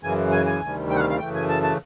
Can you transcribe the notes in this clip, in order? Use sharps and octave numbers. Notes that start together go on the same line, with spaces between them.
F#2 C#3 E3 G#5
G#5
G#5
D2 C3 D#3 G3
G5
F#5
F5
F5
F#2 C#3 E3 A3 G5
G#5
A5
A5